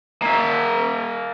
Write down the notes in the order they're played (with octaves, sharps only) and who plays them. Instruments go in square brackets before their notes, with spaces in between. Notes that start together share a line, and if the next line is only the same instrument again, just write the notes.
[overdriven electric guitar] A#3 E5